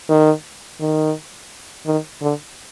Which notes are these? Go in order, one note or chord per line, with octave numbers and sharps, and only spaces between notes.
D#3
D#3
D#3
D3